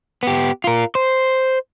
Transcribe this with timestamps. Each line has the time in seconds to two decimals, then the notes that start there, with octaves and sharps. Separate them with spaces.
0.23 B3 G4
0.64 F4 A#4
0.95 C5